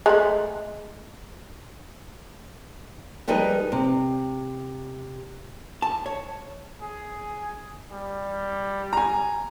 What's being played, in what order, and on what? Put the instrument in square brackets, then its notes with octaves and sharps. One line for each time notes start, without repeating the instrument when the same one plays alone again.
[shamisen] G#3 A3 B5
[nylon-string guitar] F3 G3 G#3 D#4 A#4 B4
C3
[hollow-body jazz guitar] A5
C#5
[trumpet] G#4
G3
[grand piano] G#5 A#5